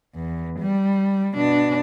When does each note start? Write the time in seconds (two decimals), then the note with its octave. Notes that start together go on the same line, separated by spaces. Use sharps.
0.15 E2
0.60 G3
1.35 B2 D4